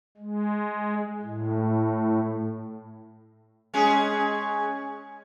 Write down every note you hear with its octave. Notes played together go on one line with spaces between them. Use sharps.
G#3
A2
G#3 C#4 G#4